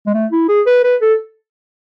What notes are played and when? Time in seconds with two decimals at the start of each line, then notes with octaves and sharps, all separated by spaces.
0.07 G#3
0.14 A3
0.32 E4
0.49 G#4
0.66 B4
0.84 B4
1.02 A4